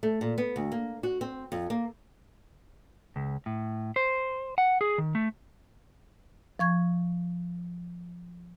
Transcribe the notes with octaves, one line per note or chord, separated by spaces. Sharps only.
A3
A#2
B3
D2
A#3
F#4
C4
F2
A#3
C#2
A2
C5
F#5
G#4
D#3
A3
F3 C#6 G#6